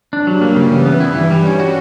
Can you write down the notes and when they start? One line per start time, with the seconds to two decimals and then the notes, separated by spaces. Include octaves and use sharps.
0.12 G2 G3 D4
0.27 F#3
0.41 A#3
0.56 C#3
0.71 E3
0.85 B3
1.00 E4
1.16 E3
1.31 G3
1.46 C#4
1.60 F#4